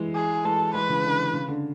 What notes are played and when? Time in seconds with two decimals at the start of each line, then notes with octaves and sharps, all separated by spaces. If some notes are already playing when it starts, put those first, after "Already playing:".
Already playing: E3 G#3
0.15 G#4
0.45 E3 G#3 A4
0.74 E3 G#3 B4
0.89 C#3 E3
1.04 D3
1.33 C#3
1.48 D3